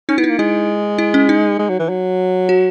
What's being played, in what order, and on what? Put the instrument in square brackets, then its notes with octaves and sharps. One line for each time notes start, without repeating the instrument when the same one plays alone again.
[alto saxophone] C#4 [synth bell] D#4
[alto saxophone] B3 [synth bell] E4
[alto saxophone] A#3 [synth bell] D#4
[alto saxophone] G#3 [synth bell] E4
[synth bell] E4
C#4
D#4
[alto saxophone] G#3
F#3
E3
F#3
[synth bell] F#4